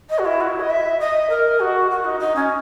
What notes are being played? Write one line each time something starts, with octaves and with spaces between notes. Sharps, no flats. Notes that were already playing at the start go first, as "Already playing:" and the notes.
D#5
F#4
E4
F#4
E4
D#5
E5
D#5
A#4
F#4
F#4
D#4
D#4
C#4